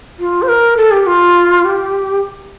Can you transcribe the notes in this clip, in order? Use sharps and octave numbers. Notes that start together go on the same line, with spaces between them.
F4
C5
A#4
A4
G4
F4
G4